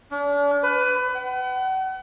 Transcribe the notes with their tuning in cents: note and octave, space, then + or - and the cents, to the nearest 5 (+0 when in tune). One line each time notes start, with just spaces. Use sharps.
D4 -40
B4 +25
F#5 +40